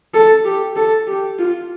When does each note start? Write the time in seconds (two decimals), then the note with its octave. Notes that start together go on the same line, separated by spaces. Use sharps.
0.14 A4
0.45 G4
0.76 A4
1.08 G4
1.39 F4